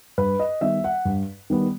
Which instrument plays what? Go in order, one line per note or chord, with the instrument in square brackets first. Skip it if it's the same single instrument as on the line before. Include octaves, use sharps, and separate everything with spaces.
[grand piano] G2 B4
D#5
D#3 G3 B3 E5
F#5
G2
D#3 G3 B3